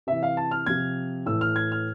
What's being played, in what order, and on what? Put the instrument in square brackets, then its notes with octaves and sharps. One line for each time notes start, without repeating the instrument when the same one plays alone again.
[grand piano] C3 E3 E5
F5
A5
F6
C3 F3 G#6
A2 E3 E6
F6
G#6
F6